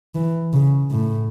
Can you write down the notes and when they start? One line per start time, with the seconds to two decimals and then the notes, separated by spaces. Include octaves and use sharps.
0.15 E3
0.53 C#3
0.91 A2